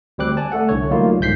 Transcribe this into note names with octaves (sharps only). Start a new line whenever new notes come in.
D2 G3 C4 D6 F#6
D5 G#5 A5
A3 A4 F#5
C2 D3 C#5
F#3 G3 A3 A#3 D#4 F4
G1 C2 G#2 G6 B6 C7